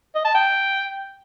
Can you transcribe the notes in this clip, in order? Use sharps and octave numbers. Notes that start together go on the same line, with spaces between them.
D#5
A5
G5